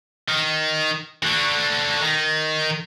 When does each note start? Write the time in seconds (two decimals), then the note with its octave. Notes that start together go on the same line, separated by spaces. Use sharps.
0.29 D#3
1.23 D3 F#4
2.02 D#3